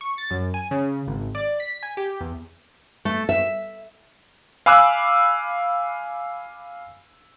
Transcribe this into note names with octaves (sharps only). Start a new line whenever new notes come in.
C#6
A6
F#2
G#5
C#3
G#1
D5
B6
G#5
G4
E2
A3
E5
F5 G#5 B5 D6 E6 F#6